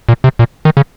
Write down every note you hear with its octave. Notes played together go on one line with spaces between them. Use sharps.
A#2
C3
A#2
D#3
C#3